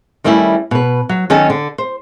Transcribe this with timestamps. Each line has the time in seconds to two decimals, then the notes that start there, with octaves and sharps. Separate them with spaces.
0.24 D#3 G3 A3 C#4 E4
0.71 B2 B4
1.09 F#3
1.30 D#3 F#3 C#4 D#4 A4 A5
1.50 D3
1.78 C5